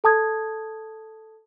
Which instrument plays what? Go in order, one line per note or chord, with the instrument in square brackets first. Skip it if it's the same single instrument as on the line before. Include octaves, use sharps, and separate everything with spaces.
[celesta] A4 A5 D#6 G#6